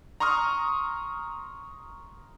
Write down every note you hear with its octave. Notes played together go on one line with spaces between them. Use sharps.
A#5 C6 C#6 D#6 F6